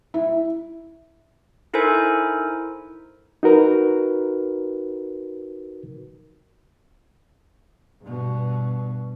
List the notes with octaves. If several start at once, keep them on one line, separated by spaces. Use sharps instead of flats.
E4
D#4 E4 A4 A#4 C5 G#5
D#4 F#4 A#4 B4
G2 B2